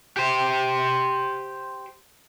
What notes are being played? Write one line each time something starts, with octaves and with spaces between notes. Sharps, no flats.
G4 C5